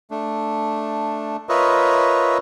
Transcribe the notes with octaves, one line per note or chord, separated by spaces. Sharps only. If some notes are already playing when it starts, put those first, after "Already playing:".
A3 D4
F4 A#4 B4 C#5 D#5 E5